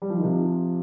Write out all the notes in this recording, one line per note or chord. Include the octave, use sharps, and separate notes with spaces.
G3
F3
D#3
C3 F3